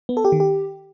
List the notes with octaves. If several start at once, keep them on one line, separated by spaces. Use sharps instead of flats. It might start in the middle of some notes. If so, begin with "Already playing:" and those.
B3
A4
G4
D#3
G4